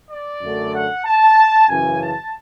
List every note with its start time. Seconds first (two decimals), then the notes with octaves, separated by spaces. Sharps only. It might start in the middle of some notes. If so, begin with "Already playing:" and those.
0.11 D5
0.42 F#2 D3 A3
0.74 F#5
1.05 A5
1.68 F#2 C#3 E3 G#5
2.00 A5